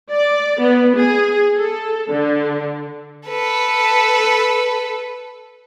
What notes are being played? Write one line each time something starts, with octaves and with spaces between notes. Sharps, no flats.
D5
B3
G#4
A4
D3
A4 B4